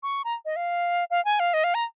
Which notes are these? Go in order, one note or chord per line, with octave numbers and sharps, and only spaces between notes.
C#6
A#5
D#5
F5
F5
G#5
F5
D#5
F5
A#5